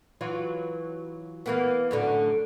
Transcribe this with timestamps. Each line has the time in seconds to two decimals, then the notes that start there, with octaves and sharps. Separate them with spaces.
0.21 E3 F#3 F4
1.46 E3 A#3 B3
1.91 F#2 A2 D3